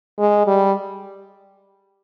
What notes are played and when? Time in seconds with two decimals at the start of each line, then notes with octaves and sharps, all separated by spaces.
0.19 G#3
0.47 G3